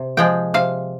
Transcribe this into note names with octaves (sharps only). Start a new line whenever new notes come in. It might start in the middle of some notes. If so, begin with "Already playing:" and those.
Already playing: C3
F3 G#3 G5
C3 F5